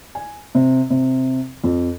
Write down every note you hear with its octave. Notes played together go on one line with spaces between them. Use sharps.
G#5
C3
C3
F2